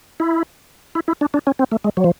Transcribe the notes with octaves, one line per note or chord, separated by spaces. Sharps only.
E4
E4
E4
D4
D4
C#4
C4
A3
G#3
F#3
F3